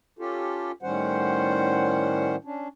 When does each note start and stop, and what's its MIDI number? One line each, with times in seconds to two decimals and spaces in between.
0.19 0.72 61
0.19 0.72 65
0.19 0.72 67
0.19 0.72 69
0.83 2.36 45
0.83 2.36 51
0.83 2.36 55
0.83 2.36 61
0.83 2.36 72
0.83 2.36 78
2.45 2.68 61
2.45 2.68 62